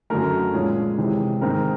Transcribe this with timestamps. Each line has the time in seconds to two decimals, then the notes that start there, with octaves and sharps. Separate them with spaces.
0.10 F#2 D3 F#3 A3 A#4
0.53 A#2 F3 G#3 C#4 G#4
0.98 C3 E3 G#3 C4
1.41 G#2 D#3 G#3 C4 A#4